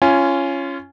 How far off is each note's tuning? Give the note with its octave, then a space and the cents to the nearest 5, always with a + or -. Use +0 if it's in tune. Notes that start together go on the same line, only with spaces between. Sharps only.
C#4 +0 F4 -25 G#5 +0